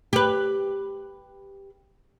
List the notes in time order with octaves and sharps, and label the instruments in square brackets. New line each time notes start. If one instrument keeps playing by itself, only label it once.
[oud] G4 B4